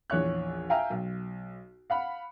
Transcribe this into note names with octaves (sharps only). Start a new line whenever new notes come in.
A#1 E2 C#5 F#6
E5 F5 G5 G#5 A#5
B1
F5 F#5 B5